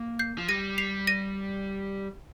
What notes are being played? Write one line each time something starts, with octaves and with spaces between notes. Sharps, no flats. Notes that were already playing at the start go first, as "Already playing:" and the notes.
Already playing: A#3
G6 C7
F3
G3 A#6 D#7
C7 F7
A#6 D#7